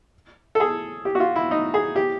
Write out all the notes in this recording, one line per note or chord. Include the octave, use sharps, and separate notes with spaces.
A4
G#4
G4
F#4
F4
E4
D#4
G#4
G4